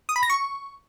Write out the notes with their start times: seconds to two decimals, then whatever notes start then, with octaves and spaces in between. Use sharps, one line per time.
0.09 D#6
0.16 B5
0.23 A#6
0.30 C#6